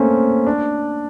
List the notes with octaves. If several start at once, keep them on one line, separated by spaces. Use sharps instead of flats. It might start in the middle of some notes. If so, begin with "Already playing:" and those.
Already playing: A3 A#3 C4 C#4
D4